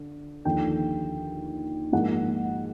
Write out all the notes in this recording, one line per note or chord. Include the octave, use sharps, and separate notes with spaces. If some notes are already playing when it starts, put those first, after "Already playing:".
Already playing: D3
D#2 D3 F3 G5
G#2 F3 A#3 F#5